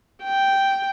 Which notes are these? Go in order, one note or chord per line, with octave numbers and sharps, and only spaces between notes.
G5